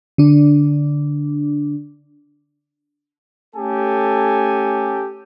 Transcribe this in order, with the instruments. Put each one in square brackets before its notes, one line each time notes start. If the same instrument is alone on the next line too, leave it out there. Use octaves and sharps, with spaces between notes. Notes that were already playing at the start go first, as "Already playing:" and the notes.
[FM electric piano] D3 D4
[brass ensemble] A3 C#4 G4 A4 G#5